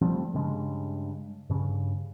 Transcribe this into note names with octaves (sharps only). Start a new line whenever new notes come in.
F3 G3 A3 C4
G2 C#3 G#3
G2 C#3